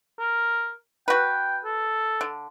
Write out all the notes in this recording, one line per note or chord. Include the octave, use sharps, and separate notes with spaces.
A#4
F#4 B4 G5
A4
D3